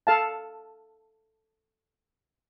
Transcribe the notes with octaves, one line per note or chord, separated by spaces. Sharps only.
A4 F5 A5